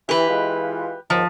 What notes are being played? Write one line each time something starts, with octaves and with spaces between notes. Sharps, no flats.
E3 G4 B4
E3 G#3 F4
D#2 G#2 F3